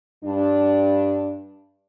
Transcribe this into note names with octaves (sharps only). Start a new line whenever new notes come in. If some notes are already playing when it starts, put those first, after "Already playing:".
G2 D4